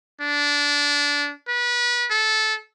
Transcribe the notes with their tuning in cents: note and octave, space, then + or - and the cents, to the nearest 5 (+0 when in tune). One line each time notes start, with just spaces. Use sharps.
D4 -20
B4 -30
A4 -15